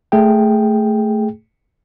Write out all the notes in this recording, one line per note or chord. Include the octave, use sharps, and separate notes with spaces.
A3 G#4 G5